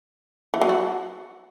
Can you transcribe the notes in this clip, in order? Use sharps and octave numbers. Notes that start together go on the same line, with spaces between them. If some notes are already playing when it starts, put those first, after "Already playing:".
E3
F#3
F#4